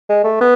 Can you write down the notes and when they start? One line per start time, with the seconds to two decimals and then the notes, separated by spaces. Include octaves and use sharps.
0.09 G#3
0.24 A3
0.41 B3